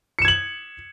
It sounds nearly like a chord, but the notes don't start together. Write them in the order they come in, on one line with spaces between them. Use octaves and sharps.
C#7 E7 G#6 F#7